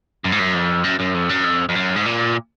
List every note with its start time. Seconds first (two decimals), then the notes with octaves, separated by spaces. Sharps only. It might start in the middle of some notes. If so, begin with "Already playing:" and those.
0.24 F#2
0.32 G#2
0.39 F#2
0.54 F2
0.85 F#2
1.00 F#2
1.15 F2
1.30 F#2
1.45 F2
1.69 F2
1.75 F#2
1.96 G#2
2.06 A#2